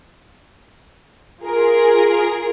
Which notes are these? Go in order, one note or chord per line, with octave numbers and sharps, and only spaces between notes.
F4 G#4 A#4